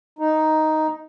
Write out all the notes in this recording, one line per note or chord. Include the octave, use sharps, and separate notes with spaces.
D#4